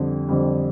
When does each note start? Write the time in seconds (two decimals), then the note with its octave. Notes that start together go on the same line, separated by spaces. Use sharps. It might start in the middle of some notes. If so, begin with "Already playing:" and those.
Already playing: F2 D3 G3
0.28 F2 D3 G3